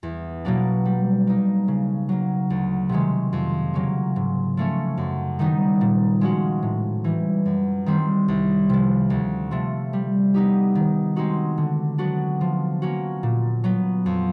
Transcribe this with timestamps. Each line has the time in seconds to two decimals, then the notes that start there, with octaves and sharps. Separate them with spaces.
0.03 E2
0.45 B2 F#3 A#3 D4
0.85 G3
1.27 A#3 D#4
1.68 C#3
2.09 F#3 A#3
2.50 D2
2.89 C3 D#3 G#3 C#4
3.33 F2
3.74 C#3 F#3 A#3 C#4
4.16 G#2
4.57 F3 A3 C#4
4.97 F#2
5.39 D#3 G3 B3 D#4
5.81 A#2
6.21 F3 G#3 C#4 F#4
6.63 A2
7.04 E3 G3
7.46 F#2
7.86 D#3 G3 C4
8.28 C2
8.69 C3 F3
9.10 D2
9.51 C3 F3 A3
9.93 G3
10.34 B3 D#4 G4
10.75 D#3
11.16 G#3 C4 D#4 F#4
11.58 D3
11.98 F#3 B3 D4 F#4
12.41 F3
12.82 A#3 C#4 F#4
13.23 A#2
13.64 F#3 B3
14.06 F2